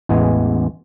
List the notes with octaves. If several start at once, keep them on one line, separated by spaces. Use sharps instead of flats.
A1 E2 G#3 B3 G#5